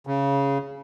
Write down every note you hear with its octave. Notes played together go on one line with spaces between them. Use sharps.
C#3